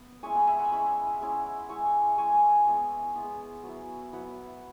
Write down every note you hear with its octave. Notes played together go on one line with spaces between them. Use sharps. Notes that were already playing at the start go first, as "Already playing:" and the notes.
Already playing: B3
G#3 C#4 E4 G#5 C#6
F#5 B5
E5 G#5
F#5 B5
G#3 C#4 E4
G#3 C#4 E4
G#3 E4 G#5 C#6
G#3 E4 G#5 C#6
G#3 B3 E4
G#3 B3 E4
F#3 B3 E4
F#3 B3 E4 F#5 B5